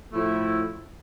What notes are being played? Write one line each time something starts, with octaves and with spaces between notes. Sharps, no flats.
A2 F3 A3 E4